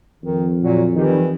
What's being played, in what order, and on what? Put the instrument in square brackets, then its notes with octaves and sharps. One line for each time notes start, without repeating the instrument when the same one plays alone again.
[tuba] F2 [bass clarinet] D#3
[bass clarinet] A#2 [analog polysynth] F#3
[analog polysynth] D#3 G3 [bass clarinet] E3